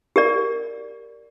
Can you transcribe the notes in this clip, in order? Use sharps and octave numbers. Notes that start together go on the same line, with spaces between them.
G4 A#4 D5